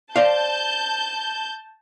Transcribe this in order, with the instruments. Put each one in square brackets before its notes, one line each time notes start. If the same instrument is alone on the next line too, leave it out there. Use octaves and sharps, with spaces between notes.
[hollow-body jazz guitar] C5 D5 F5 [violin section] A5 G6